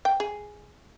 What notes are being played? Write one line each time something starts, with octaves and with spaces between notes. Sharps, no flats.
G5
G#4